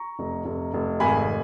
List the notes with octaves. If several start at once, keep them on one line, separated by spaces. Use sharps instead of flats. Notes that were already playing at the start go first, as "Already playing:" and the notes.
Already playing: A#5 C#6
F1
F1
F1
G#1 G#5 B5